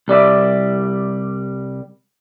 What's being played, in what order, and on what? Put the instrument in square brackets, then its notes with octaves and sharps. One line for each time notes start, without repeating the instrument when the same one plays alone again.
[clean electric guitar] C2 G3 D5 E5